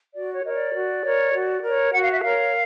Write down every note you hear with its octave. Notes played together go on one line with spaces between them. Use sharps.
F#4 D5
C#5
A#4 C#5 D#5
D5
F#4
A#4 C#5
F#4
A#4 C#5
F#4 F#5
F5
E5
A#4 C#5 F5